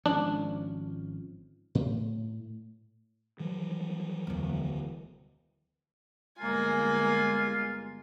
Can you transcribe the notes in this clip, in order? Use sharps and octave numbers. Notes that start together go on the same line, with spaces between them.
G#1 F3 C#4 D4
A2
D#3 E3 F#3 G3
E1 D2
G1 G#3 A#3 F4 G#5